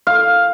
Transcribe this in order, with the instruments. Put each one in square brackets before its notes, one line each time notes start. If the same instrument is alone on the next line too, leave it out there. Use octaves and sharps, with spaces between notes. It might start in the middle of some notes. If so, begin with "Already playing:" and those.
[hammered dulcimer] F5